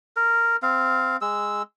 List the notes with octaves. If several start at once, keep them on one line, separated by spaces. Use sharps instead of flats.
A#4
C4 F5
G#3 E6